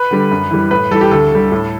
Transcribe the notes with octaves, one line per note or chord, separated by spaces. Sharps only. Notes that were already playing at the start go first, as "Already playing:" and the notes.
Already playing: B4
D3 G3
F#2
E3 G3
A2 B4
E3 G3 A4
G4
D2 A4
D3 G3
A2